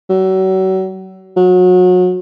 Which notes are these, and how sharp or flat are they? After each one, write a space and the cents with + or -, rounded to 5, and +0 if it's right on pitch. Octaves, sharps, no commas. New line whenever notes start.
F#3 +35
F#3 -30